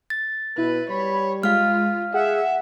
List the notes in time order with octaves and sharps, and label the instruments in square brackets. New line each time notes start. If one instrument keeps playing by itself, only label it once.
[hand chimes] A6
[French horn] B2 [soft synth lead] E4 [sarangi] B4
[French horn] G3 [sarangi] C#5 [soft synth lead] B5
[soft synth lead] G#3 [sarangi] F4 [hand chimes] F5 F6
[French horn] G#4 [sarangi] E5 [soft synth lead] F#5